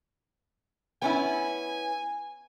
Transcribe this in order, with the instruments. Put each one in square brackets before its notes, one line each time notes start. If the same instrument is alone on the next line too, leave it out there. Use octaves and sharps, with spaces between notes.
[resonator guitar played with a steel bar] B3 C#4 E4 [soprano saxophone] G#5